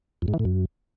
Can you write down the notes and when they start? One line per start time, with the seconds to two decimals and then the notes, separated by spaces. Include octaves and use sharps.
0.22 F2
0.28 G#2
0.34 E3
0.39 A2
0.45 F#2